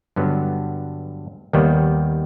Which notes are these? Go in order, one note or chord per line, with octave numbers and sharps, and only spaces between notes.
G2 D3 F#3 B3
D#2 D#3 G3 B3